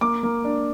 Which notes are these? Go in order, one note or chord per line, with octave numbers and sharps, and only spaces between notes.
A#3 D6
A#3
D4